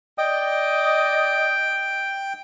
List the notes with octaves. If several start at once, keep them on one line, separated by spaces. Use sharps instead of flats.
D5 D#5 G5